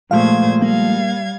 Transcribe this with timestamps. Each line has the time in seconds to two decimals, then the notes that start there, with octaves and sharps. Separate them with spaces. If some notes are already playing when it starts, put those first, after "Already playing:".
0.11 A#2 F3 G#3 A3 C5 F5 G#6
0.62 G3 A#3 F5 G#6